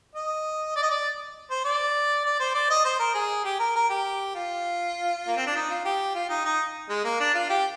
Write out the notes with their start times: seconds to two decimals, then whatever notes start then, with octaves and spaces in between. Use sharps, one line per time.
0.15 D#5
0.76 D5
0.83 D#5
0.90 D5
1.51 C5
1.65 D5
2.25 D5
2.40 C5
2.55 D5
2.70 D#5
2.85 C5
2.99 A#4
3.14 G#4
3.45 G4
3.59 A#4
3.76 A#4
3.90 G4
4.35 F4
5.27 A#3
5.36 C4
5.46 D4
5.55 D#4
5.69 F4
5.85 G4
6.15 F4
6.30 D#4
6.45 D#4
6.89 G#3
7.04 A#3
7.20 D4
7.35 F4
7.49 G4